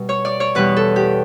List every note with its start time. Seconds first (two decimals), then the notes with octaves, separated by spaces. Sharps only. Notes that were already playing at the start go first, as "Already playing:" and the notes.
Already playing: B2 G3
0.09 C#5
0.25 D5
0.40 C#5
0.55 E2 B2 G3 B4
0.76 A4
0.96 G4